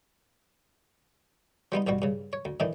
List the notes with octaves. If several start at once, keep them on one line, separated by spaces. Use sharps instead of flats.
F3 G3 B3 D#4
A1 G2 B2 G3 F#4
G2 C#3
C#5
D2
A2 D#3 E3 D4 D#4